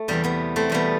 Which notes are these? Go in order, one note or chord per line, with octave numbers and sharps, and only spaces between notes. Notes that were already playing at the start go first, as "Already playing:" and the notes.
Already playing: A3
E2 C3 E3 G3
G3 B3
A3 C4
E2 B2 G3 B3